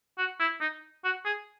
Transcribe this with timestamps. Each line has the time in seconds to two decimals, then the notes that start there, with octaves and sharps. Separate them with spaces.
0.18 F#4
0.40 E4
0.61 D#4
1.04 F#4
1.25 G#4